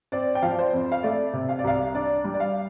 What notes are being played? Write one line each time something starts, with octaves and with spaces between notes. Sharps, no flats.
C4 D5
G5
F3 F5
D5
C5
F2
F5
A3 D5
C3
F5
D5
C2 F5
D4 D5
G3
D5
F5